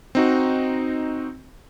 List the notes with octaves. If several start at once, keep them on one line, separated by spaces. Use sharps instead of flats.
C4 D#4 F#4